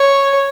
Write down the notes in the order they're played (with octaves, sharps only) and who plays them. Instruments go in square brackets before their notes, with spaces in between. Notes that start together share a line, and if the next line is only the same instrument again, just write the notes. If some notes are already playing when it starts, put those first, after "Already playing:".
Already playing: [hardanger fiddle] C#5